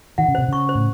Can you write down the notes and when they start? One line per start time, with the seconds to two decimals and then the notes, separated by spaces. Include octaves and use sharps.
0.18 D#3 F#5
0.28 C#3
0.35 C3 C5
0.48 C#3 C#6
0.69 C5
0.75 A2